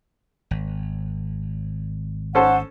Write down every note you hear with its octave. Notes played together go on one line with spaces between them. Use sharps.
G#1
C#4 A4 C5 F#5